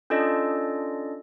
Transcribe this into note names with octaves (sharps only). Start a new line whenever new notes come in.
C#4 D4 F4 A4 D5 D#5